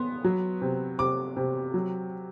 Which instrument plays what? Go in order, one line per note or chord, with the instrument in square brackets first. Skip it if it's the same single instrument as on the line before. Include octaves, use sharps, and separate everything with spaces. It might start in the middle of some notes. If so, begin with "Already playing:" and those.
Already playing: [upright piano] B3 C6
F#3
C3
C3 D6
C3
F#3